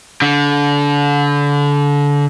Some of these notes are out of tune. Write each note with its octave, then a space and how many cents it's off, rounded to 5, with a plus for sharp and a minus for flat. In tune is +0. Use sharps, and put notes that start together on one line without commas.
D3 -30